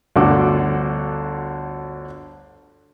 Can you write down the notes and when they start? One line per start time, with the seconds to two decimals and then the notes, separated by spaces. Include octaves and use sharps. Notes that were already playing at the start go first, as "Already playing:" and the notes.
0.16 G1 D2 D3 F#4 A4 D6